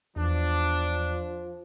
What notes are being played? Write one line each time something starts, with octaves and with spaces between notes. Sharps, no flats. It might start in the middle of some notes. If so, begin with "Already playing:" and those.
E2 F3 D4